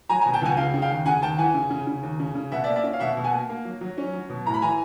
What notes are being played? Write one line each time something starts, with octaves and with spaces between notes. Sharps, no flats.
F#3 G#5 A#5
G#5 A#5
B2
G5 A5
C#2 F#5 G#5
C#3 F5 G5
C#3
F5 G5
D#2
C#3 F#5 G#5
D#2 G5 A5
E3 F#5 G#5
C#3
C#3
C#3
D#2
C#3
C#3
B2 E5 F#5
D5 E5
A#3
D5 E5
C#4
F5
B2 E5 F#5
B2
F#5 G#5
A#3
A#3
F#3
F#3
C#4
F#3
B2
A2 A#5
B5
E3 G#5 A#5